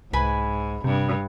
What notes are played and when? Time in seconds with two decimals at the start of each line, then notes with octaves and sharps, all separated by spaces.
0.13 C2 G#2 B4 G#5 B5
0.84 G2 C3